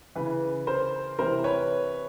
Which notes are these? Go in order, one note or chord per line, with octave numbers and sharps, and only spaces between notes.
C#3 E3 B4
A#4 C5
C3 E3 A#4 C5
B4 C#5